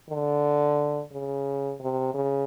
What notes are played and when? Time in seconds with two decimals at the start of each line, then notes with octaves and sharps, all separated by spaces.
0.10 D3
1.12 C#3
1.80 C3
2.14 C#3